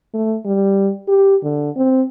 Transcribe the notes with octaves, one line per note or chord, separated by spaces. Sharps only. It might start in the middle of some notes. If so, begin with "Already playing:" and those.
A3
G3
G4
D3
C4